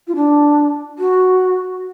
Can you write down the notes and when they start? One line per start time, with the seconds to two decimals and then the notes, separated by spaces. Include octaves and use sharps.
0.08 F4
0.15 D4
0.99 F#4